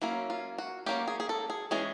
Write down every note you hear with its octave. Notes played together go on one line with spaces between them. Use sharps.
F#3 A#3 C#4 E4
F4
F#4
F#3 A#3 C#4 G4
G#4
G#4
A4
G#4
E3 G#3 C#4 G#4